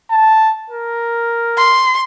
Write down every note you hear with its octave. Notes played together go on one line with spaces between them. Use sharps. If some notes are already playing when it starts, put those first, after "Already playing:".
A5
A#4
C6